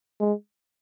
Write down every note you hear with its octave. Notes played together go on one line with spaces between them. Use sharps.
G#3